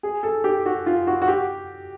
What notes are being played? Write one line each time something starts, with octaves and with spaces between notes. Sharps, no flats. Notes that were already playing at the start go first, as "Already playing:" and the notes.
G#4
A4
G4
F#4
F4
F#4
F#4
G4